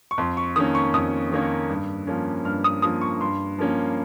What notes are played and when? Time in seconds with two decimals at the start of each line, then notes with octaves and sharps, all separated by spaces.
0.11 C#6
0.18 F2 C6
0.37 C#6
0.56 D#3 A#3 C#4 D#6
0.75 C#6
0.94 F2 D#6
1.32 D#3 A#3 C#4
1.69 G2
2.07 F3 A#3 C#4
2.45 G2 F6
2.64 D#6
2.82 F3 A#3 C#4 D#6
3.01 C#6
3.21 G2 C6
3.59 F3 A#3 C#4